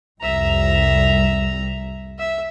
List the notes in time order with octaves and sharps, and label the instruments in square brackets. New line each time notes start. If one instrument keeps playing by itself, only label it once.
[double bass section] C2 F2 G3 [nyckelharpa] E5 A#5
[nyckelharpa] E5